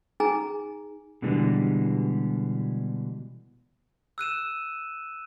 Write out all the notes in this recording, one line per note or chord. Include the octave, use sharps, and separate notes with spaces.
D#4 G#4 G#5 A#5
B2 D3 E3 G3 G#3
E6 F#6 D#7 E7